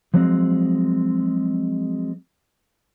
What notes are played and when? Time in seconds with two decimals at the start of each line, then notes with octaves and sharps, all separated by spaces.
0.14 F3 F#3 G#3 C4